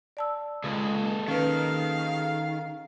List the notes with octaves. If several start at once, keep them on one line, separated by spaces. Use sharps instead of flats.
D5 A5 E6
C#2 G#4 A4 D#5
D#3 C#4 B4 F5